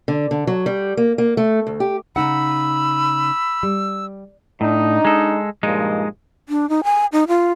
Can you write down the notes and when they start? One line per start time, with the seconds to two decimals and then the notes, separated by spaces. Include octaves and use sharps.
0.08 D3
0.31 D3
0.47 F#3
0.66 G3
0.97 A#3
1.18 A#3
1.37 A3
1.67 D2
1.80 G4
2.16 C#3 D#4 F#5 B5 E6
3.63 G3
4.61 A2 D4 D#4
5.05 G#3 A4
5.63 G2 A#2 F3 G#3 D#4
6.49 D4
6.69 D#4
6.84 G#5
7.12 D#4
7.28 F4